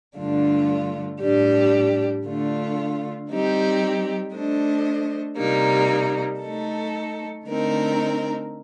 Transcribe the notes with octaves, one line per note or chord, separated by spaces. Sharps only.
G2 D3 A3 D4 F4
A2 G3 D4 G4
D3 A3 D4 F4
G3 C4 D#4 G4
A3 D4 A4 C5 D#5
C3 G3 A#3 D#4
A3 D#4 A4
D3 A3 C4 D#4 A#4